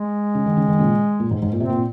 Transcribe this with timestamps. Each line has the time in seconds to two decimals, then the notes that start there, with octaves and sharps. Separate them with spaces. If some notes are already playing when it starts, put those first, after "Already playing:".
Already playing: G#3
0.35 C#3
0.46 D#3
0.57 C#3
0.68 D#3
0.78 A#2 C#3
1.20 A#2
1.31 G#2
1.42 G#2
1.53 A#2
1.60 C3 C4
1.70 A#2